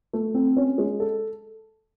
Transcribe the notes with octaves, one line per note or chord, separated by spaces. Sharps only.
A3
C4
C#4
G#3
A4